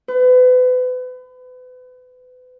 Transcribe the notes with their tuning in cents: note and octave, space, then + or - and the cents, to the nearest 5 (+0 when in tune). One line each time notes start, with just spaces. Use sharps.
B4 +35